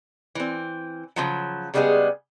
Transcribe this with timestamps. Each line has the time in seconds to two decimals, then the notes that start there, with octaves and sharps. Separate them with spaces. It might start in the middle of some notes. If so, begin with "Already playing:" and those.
0.35 E3 C4
1.16 C#3 F3 F#3
1.74 C#3 G3 G#3 B3 D#4 G#4